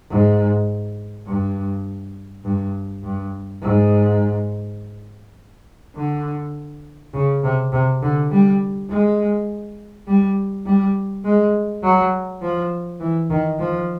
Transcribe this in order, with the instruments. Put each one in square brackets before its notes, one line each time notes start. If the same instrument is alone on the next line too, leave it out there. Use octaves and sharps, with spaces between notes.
[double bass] G#2
G2
G2
G2
G#2
D3
C#3
C3
C3
D3
G3
G#3
G3
G3
G#3
F#3
F3
E3
D#3
F3